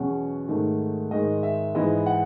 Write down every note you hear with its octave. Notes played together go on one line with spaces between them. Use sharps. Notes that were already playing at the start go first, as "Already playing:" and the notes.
Already playing: E2 B2 F#3 C#4 F#5
G#2 D#3 A3
G#2 D#3 G#3 D#5
E5
G#2 E3 B3 E4 D#5
F#5